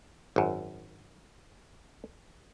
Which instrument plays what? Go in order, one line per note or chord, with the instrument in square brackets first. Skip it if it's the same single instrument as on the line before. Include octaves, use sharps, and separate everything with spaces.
[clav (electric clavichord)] G#1 F#2